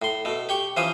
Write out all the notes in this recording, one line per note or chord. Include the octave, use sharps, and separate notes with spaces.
A2 C6
B2 A3
G4 G5 C#6
E3 F3 C#4 C5 D#6